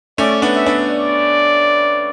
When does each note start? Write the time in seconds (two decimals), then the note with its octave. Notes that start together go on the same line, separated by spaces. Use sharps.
0.18 A3 C#4 D5
0.42 B3 D4
0.55 E5
0.66 B3 D4
0.90 D5